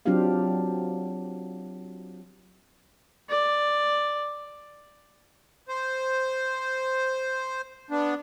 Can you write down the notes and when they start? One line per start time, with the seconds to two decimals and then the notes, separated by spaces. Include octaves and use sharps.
0.06 F#3 C4 D4 F4 G4 F5
3.29 D5
5.68 C5
7.90 B3 D4